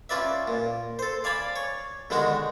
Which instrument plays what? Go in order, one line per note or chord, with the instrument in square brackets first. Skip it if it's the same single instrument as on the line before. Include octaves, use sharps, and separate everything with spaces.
[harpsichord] C#4 F4 B4 D5 E5
A#2
A4 C5
D5 F5 G#5 A5 B5 D6
C#5
B2 D3 D#3 G#3 D#4 F#4